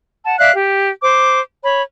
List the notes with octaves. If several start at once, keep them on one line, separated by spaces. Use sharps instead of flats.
F#5 A5
D5 E5 F5 F#6
G4
C5 D6
C#5 B5